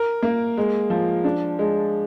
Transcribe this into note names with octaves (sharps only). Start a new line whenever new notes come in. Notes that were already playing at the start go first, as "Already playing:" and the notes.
Already playing: A#4
A#3
G#3
F3
D4
G#3